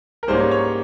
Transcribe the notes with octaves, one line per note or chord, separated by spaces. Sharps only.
A#4
G#2 G3 A#3 C#4 C5
C#5